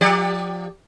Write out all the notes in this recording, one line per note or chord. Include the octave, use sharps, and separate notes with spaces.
F3 G4 D5